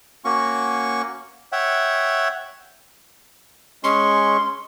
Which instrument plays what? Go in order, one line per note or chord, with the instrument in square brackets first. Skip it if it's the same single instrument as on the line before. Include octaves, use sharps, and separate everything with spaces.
[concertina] A#3 C#4 F#4 C#6
C#5 E5 F#5 G5
[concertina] G#3 C#4 C#6 [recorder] C6